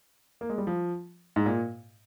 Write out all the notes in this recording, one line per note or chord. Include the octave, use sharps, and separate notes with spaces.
A#3
G#3
G3
F3
G#2
A#2